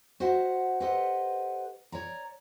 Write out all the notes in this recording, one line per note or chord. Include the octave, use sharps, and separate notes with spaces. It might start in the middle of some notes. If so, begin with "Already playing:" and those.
F#4 C5 D#5 E5 F#5
G4 A4 B4 C5 D#5 F#5
C#5 D5 A#5